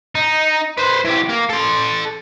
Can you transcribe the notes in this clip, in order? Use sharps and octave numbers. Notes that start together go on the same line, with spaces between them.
D#4
B4 C5
E3 G4
A#3
A4 C6